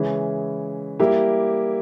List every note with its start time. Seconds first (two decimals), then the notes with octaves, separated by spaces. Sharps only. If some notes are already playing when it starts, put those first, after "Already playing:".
Already playing: C#3 E3 G#3 C#4 E4
1.00 G3 A#3 E4 G4